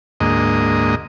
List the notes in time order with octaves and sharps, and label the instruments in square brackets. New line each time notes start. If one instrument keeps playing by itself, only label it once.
[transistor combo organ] D2 G#2 A#3 D#5